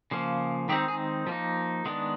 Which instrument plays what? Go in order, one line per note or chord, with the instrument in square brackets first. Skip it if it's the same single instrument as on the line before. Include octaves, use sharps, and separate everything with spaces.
[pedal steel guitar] C#3 F3 A#3
D#3 G#3 C4 D#4 G4
G#4
F3 A#3 D#4
D#3 G#3 B3 D4